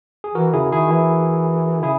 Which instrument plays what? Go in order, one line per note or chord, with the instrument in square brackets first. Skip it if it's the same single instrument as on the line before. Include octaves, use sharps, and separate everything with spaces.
[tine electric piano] G#4
[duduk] E3 [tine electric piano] F#4 A#4
[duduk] C#3 [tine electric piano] E4 G#4
[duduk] D#3 [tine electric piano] E4 G#4
[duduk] E3 [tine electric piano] E4
[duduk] C#3 [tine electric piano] E4 G#4